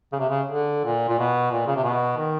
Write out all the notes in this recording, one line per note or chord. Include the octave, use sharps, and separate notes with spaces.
C#3
C3
C#3
D3
A#2
A#2
B2
A#2
C#3
C3
B2
D#3